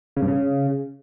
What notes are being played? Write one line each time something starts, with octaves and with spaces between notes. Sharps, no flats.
C#3
G2
C#3